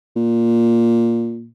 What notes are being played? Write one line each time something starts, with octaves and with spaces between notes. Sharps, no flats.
A#2